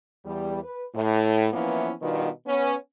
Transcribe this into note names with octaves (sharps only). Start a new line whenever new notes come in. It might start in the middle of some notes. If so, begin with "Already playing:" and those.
E2 G3
B4
A2
E3 F3 A#3 B3 C#4 E4
B2 D#3 G3 B3 D4 F4
B3 C#4